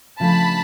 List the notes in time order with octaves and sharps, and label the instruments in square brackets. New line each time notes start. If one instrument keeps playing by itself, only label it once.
[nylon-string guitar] C#3 F3 A3 D4 [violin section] A5 B5